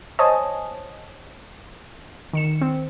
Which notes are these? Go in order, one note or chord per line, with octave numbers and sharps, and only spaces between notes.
C5 C#5 D#5 G#5 A5 D#6
D#3 C#7 E7
C4